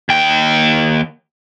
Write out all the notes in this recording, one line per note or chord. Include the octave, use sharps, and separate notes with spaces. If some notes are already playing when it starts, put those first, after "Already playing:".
D#2 G5